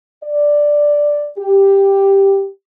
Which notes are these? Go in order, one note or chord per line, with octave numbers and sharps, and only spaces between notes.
D5
G4